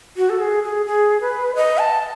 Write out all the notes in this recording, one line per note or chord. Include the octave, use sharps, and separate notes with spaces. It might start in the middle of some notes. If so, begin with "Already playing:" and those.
F#4
A4
G#4
G#4
G#4
B4
D#5
A5